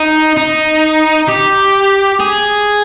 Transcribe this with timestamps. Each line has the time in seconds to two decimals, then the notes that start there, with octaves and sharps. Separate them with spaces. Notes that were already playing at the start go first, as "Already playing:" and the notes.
Already playing: D#4
0.37 D#4
1.29 G4
2.20 G#4